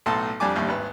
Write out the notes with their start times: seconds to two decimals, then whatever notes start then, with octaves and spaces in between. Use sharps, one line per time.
0.06 B1 A2 A4 A5 C6
0.40 F2 G3 D4 G#5 D6
0.56 A1 D#2 G3
0.68 G#1 B4